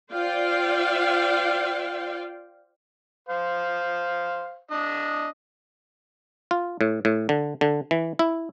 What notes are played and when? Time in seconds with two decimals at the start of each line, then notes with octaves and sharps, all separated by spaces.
0.13 F4 C5 D5 F5 G5
3.29 C5 F5
4.71 D4 D#5
6.51 F4
6.81 A2
7.05 A2
7.29 D3
7.61 D3
7.91 E3
8.19 E4